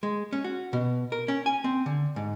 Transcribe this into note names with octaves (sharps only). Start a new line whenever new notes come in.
G#3
C#4
F#4
B2
A#4
C#4
G#5
C4
D3
G#2